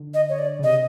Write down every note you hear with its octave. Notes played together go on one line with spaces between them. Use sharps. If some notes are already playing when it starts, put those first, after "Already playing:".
Already playing: D3
D#5
C#5
D5
C#3
C3 D#5